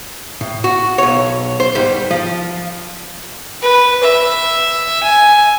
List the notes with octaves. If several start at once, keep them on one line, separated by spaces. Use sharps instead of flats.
A2
F#4
B1 C#5
C5
G#2 G3
F3
B4
E5
G#5